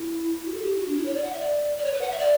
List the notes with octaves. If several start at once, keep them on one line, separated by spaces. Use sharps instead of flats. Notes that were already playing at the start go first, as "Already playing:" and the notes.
Already playing: E4
F#4
A4
G4
E4
F#4
D4
E4
C#5
D5
F#5
E5
D5
D5
C#5
B4
F#5
E5
D5